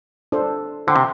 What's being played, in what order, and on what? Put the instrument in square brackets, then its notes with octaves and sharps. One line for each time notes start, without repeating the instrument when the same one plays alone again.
[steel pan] D4 A4 C5
[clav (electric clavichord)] D3 [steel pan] C5 G5 C6
[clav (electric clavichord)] C3